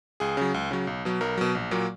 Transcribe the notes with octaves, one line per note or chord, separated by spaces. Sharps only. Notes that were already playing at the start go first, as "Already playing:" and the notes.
C#2 G#4
C#3 F#3
C#2
C#3 F#3
B1
B2 F#3
B1 A#4
B2 F#3
A#1
A#2 F#3 A#3